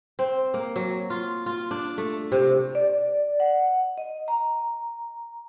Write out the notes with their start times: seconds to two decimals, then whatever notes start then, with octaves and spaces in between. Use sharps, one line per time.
0.19 C4
0.54 A#3
0.76 F#3
1.10 F4
1.46 F4
1.71 D4
1.98 A3
2.32 C3
2.75 D5
3.40 F#5
3.98 D#5
4.28 A#5